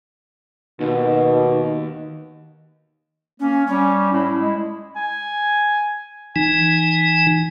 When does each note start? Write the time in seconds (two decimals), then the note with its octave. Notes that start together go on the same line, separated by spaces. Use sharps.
0.80 D#2 B2 D#4
3.40 A#3 C#4
3.67 G3 C#4
4.12 A2 E4
4.40 G#3
4.96 G#5
6.36 E3 D#4 G#5